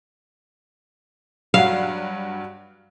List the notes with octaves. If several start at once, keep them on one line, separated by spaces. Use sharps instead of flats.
G2 F#3 F5 F#5